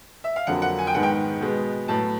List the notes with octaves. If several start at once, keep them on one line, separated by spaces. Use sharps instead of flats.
E5
F5
F2 D3 F#3 A#3 F#5
F#5
G#5
G5
G#2 D#3 G#3 B3 F#5
G5
B2 G#3 B3
A2 F#3 B3 A5